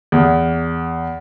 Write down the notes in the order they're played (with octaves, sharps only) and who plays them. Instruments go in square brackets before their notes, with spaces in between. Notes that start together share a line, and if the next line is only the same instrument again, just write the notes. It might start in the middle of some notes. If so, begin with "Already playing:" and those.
[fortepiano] E2